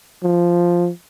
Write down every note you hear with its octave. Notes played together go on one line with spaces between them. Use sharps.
F3